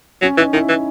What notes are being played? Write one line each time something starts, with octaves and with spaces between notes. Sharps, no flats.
F#3 C#4
E3 D#4
D#3 E4
E3